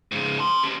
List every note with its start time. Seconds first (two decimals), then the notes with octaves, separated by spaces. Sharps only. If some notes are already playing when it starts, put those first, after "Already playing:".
0.12 G#2 C#3
0.39 A5 C6
0.63 C#4 G4